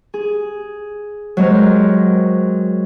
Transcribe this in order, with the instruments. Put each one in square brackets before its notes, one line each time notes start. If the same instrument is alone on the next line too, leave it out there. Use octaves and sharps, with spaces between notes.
[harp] G#4
F#3 G#3 C4 A#4